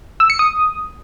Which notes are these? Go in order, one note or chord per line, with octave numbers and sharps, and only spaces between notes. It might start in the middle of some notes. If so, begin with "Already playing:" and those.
E6
C#7
D#6